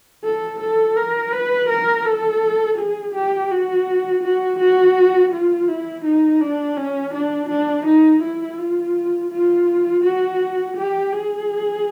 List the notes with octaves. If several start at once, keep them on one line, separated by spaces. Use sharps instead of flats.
A4
A4
A#4
B4
A#4
A4
G#4
G4
F#4
F#4
F#4
F4
E4
D#4
D4
C#4
D4
D4
D#4
E4
F4
F4
F#4
G4
G#4